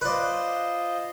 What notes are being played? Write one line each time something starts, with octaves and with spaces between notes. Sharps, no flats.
F4 B4 C5 D5 D#5